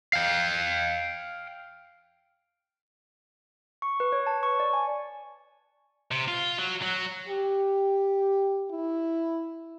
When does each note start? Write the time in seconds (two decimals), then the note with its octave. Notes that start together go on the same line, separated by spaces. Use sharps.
0.13 F5 G5
3.82 C#6
4.00 B4
4.12 C#5
4.27 A5
4.43 C#6
4.60 D5
4.73 G#5
6.11 C3
6.28 F4
6.58 F#3
6.82 F#3
7.28 G4
8.71 E4